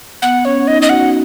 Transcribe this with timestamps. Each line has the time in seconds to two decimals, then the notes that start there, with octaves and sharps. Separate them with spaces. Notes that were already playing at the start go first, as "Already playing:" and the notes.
0.22 B3 F#5
0.45 C#4 C#5
0.67 D#4 D#5
0.82 D#5
0.89 F#4 F#5